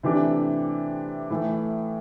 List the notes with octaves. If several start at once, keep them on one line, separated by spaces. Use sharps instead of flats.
C3 E3 A3 D4 G4
A2 E3 A3